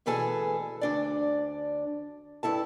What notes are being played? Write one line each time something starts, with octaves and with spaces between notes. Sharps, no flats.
D2 B2 E3 G#4 A4 G#5
D2 D4 D5
G2 E4 A4 A5